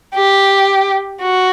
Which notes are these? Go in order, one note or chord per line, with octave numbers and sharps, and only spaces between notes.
G4
F#4